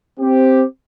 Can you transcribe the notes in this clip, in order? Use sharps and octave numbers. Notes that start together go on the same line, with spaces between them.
C4 G4